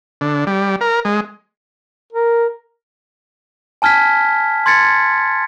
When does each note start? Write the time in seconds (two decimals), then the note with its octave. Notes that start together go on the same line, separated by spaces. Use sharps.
0.21 D3
0.47 G3
0.81 A#4
1.05 G#3
2.13 A#4
3.82 G#5 A5 F6 G#6 B6
4.66 C6 G#6 A6 C#7